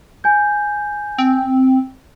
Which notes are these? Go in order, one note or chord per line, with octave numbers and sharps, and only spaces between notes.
G#5 G6
C4